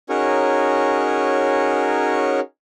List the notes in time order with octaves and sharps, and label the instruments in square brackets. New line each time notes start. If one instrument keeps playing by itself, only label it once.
[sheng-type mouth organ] C#4 D#4 F#4 G#4 A#4 C#5